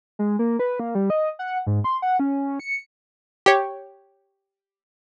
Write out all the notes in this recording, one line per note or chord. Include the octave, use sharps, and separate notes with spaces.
G#3
A#3
B4
A#3
G3
D#5
F#5
G#2
C6
F#5
C#4
C#7
G4 C#5